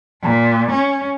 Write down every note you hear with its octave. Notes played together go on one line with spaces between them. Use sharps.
A#2
C#4